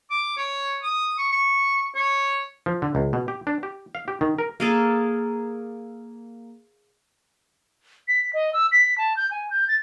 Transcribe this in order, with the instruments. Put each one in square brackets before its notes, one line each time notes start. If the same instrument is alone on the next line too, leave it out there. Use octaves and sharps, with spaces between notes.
[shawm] D6
C#5
D#6
C#6
C#6
C#5
[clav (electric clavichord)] F3
D3
C#2
B2
G4
D4
G4
F5
G4
D#3
A#4
[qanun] A#3 G#4 A4
[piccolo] B6
D#5
E6
B6
A5
G6
G#5
G6
A6